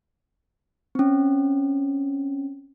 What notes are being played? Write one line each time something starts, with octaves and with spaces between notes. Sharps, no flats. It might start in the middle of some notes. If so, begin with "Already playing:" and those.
C4 C#4